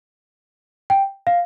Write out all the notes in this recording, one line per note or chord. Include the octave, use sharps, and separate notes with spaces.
G5
F5